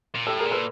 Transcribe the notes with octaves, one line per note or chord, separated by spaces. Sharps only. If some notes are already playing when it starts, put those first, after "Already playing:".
A#2
A2 G4 A4
G#4 A#4
A#2
A4 B4